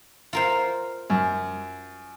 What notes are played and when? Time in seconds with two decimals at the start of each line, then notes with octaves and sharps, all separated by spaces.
0.33 F4 A#4 C5
1.10 F#2